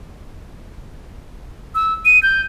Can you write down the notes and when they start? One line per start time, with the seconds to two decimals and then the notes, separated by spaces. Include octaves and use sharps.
1.75 E6
2.05 D#7
2.23 G6